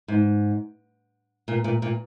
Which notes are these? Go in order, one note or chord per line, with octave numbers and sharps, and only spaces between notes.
G#2
A#2
A#2
A#2